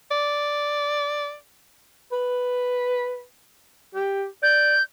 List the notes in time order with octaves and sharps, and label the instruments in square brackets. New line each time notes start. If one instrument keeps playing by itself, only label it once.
[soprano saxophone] D5
[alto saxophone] B4
G4
[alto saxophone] D5 [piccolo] G6